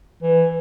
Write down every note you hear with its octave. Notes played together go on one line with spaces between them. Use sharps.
E3